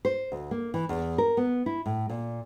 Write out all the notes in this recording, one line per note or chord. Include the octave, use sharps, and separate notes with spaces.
C5
D2
A#3
E3
E2
A#4
B3
E4
A2
A#2